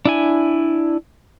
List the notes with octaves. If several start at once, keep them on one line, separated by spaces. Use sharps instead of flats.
D4 E4 G#5